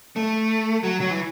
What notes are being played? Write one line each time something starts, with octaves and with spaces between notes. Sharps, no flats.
A3
F#3
F#3
E3